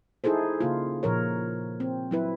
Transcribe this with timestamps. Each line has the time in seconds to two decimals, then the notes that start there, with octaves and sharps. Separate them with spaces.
0.24 D#4 E4 G#4 A4 C5
0.60 C#3 A#3 F4
1.03 A#2 F3 A#4 C#5
1.80 C4
2.11 F#3 E4 B4